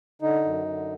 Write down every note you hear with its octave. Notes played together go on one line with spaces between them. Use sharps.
D3 D#4
F#2
D3